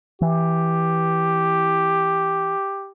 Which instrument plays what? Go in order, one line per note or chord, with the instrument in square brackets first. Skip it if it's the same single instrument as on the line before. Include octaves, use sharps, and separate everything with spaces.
[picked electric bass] E3 [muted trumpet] G4